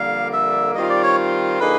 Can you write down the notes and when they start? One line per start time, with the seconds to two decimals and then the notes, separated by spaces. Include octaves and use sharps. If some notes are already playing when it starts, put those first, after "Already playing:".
Already playing: F2 D3 G3 A#3 F5
0.33 E5
0.75 D#3 G3 C4 F4 D#5
0.89 D5
1.04 C#5
1.60 D3 F3 A#3 D#4 G#4 B4